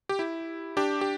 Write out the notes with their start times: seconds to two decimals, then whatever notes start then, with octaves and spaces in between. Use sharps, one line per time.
0.09 G4
0.19 E4
0.77 D4 G4
1.01 G4